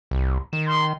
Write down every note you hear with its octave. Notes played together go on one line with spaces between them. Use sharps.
C2
D#3 E7
C6